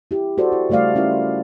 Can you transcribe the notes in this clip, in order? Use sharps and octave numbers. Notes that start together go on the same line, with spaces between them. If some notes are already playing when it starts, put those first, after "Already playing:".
E4 G4
F#4 A4 C5 D5
E4
C#3 G3 A3 D5 F5
C#4 E4 F4 A#4